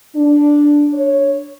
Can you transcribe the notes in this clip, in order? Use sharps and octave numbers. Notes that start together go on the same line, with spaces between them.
D4
C#5